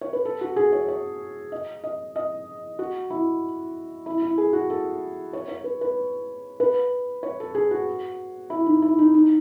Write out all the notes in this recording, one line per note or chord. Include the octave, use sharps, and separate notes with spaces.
C#5
B4
A4
F#4
G#4
C#5
C#5
D#5
D#5
D#5
F#4
E4
E4
E4
G#4
F#4
A4
C#5
C#5
B4
B4
B4
C#5
A4
G#4
F#4
E4
D#4
E4
D#4
D#4